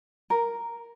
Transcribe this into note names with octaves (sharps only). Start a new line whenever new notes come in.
A#4